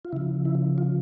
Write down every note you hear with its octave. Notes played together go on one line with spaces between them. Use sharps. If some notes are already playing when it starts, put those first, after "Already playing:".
F4
C#3 F3 E4
E4
F4